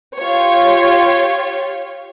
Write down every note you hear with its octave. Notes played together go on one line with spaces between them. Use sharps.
F4 G4 C#5